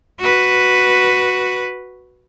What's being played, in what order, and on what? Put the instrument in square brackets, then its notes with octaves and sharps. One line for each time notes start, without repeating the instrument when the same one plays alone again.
[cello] F#4 B4